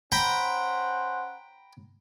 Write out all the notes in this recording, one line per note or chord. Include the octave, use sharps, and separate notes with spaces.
C#4 C5 F#5 G5 A#5 B5